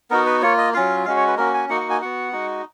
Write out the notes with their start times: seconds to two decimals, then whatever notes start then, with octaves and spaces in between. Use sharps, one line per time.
0.10 B3 D#4 F#4 A#4
0.26 B4
0.42 A#3 F4 C#5
0.58 D#5
0.74 F#3 C#4 F4 F5
1.05 G#3 C#4 F#4 F5
1.17 C#5
1.27 B4
1.37 A#3 C#4 F#4 A#4
1.54 G#5
1.69 A#3 D#4 F#4 F#5
1.80 F#5
1.90 G#5
2.01 B3 F#4 F#5
2.33 G#3 D#4 F#4